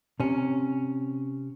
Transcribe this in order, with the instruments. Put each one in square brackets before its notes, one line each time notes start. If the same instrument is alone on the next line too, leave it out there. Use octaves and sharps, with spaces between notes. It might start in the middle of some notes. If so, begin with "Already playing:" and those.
[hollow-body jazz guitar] C3 C#4